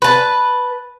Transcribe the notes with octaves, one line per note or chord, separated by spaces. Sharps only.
B4 A5